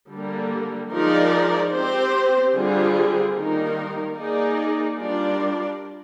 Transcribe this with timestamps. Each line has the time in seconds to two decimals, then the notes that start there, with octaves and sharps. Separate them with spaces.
0.11 D3 G3 A#3
0.92 F3 G#3 D#4 A#4 D5
1.73 C4 G4 C5
2.54 D3 G3 C4 F4 G#4
3.35 D#3 G3 A#3 D#4 A#4
4.16 A#3 D#4 G#4 D5
4.97 G3 D4 F4 A#4 D5